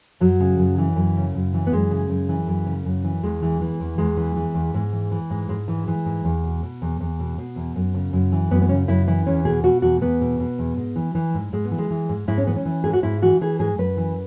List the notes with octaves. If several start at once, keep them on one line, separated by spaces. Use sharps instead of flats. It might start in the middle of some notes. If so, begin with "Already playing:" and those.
F#2 F#3
C#3
F#2
E3
F#2
C#3
F#2
E3
B3
F#2 G#3
C#3
F#2
E3
F#2
C#3
F#2
E3
E2 G#3
E3
E3
E2
E2 G#3
E3
E3
E2
G#2
E3
E3
G#2
G#2 G#3
E3
E3
G#2
E2
B2
B2
E2
E2
B2
B2
E2
F#2
C#3
F#2
E3
F#2 B3
B3
C#3 C#4
F#2 E4
E3 E4
E2 C#4
B2 G#4
B2 F#4
E2 F#4
E2 B3
B2
B2
E2
G#2
E3
E3
G#2
G#2 G#3
B3
E3
G#3
E3
G#2
G#2 E4
C#4
E3 B3
C#4
E3
G#2 G#4
F#4
G#2 E4
E3 F#4
E3 G#4
G#2 G#4
F#2 B4
E3